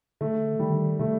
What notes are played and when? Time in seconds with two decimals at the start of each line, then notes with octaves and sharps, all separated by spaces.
0.21 D3 A3
0.59 D#3 G3
0.99 C3 A3